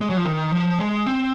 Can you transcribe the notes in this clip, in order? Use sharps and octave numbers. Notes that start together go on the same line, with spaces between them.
G#3
F#3
F3
D#3
F3
G#3
C4